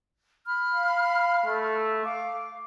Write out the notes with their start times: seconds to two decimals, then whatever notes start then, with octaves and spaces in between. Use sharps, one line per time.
0.44 B5 F6
0.74 F5
1.45 A3
2.05 F5 D6